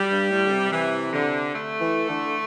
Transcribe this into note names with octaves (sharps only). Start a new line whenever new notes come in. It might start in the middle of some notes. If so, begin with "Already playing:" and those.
Already playing: G3
G2
A2
D3
C3
E3
D3
A3
E3
D3